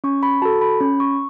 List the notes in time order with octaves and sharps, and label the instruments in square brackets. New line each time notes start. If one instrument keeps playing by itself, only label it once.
[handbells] C#4 C#6
B5
F#4 A4 A5
B5
C#4 B5
C#6